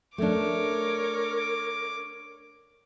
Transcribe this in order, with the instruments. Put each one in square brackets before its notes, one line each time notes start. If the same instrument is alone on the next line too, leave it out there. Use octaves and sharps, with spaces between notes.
[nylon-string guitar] A3 D4 [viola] A#4 C#5 [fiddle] D6